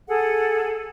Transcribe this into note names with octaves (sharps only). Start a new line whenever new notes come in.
G#4 A4 F#5